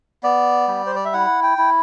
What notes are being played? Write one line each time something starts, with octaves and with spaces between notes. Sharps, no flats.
B3 D5
G3
C5
D5
E5
E4 F#5
G5
E4